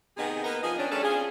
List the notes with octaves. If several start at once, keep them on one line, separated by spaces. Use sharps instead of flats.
C3 D#3 B3 D#4 G#4
A#3 B3 D#4 A#4 B4
F3 G#4 D#5
D#3 C#4 D4
G3 A3 C#4 D4 G#4 A4
C4 C#4 F4 G#4